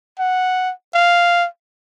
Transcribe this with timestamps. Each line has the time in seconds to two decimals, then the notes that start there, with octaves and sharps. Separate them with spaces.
0.19 F#5
0.94 F5